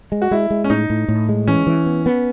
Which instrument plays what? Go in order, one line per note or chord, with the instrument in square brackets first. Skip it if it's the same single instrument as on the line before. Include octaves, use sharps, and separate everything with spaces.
[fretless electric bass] G#3
[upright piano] F#4
[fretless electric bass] G#3 [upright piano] E4
[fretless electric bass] G#3
[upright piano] C#4
[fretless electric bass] A2 [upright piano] D#4
[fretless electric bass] A2
A2
G#3
[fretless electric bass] E3 [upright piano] C#4
[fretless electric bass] E3
B3
B3